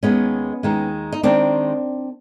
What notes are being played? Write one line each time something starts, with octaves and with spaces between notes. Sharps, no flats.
D#2 D#3 G#3 B3 C#4
D#2 D#3 G#3
D#4
D#3 G#3 C4 D4